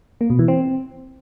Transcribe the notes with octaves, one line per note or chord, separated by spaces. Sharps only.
A#3
B2
E3
C4